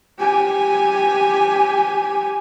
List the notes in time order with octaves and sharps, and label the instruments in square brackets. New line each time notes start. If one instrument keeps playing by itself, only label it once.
[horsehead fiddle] G4 G#5